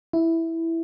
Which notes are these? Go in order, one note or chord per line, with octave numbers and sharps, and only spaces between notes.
E4